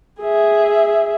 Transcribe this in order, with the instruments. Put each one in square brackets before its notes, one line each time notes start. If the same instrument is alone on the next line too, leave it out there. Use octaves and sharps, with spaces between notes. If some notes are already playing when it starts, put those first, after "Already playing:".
[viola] G#4 E5